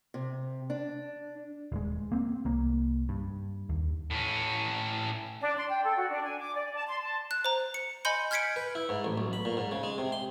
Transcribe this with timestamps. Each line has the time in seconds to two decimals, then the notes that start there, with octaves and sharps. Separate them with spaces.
0.14 C3
0.70 D4
1.72 D#1 G#3
2.12 A#3 C4
2.45 C2 A#3
3.09 G2
3.69 D#2
4.10 A2 C#4
5.41 D4
5.57 C6
5.69 G5
5.83 A4
5.96 F#4
6.10 D4
6.23 G#5
6.39 D6
6.54 D5
6.74 A5
6.88 C6
7.01 A5
7.31 F#6
7.45 C5 A#5
7.74 C#7
8.05 D#5 G#5 B5 C6 G6 C#7
8.31 F6 G6 G#6 B6 C#7 D7
8.56 B4
8.75 E4
8.89 G#2
9.05 A1
9.18 B1
9.33 B5
9.45 A#2
9.57 G#2
9.72 C#3
9.83 G#3
9.98 C3
10.12 C6